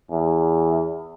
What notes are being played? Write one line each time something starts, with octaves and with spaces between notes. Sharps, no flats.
E2